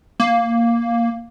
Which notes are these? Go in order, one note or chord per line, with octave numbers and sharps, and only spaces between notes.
A#3